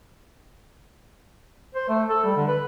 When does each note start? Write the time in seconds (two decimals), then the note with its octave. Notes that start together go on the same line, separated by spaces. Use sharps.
1.75 C5
1.89 A3
2.09 A4
2.24 G3
2.36 D3
2.48 B4